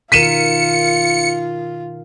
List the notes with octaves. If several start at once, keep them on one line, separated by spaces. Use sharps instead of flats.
B2 D#3 F4 A#4 B6 C#7 D#7 E7